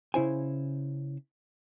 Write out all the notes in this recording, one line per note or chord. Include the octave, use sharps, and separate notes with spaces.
C#3 E4 C5 G#5